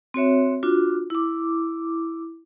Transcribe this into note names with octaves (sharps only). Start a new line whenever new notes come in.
C4 F#4 C#5 E5
D4 F4 F#4
E4 D6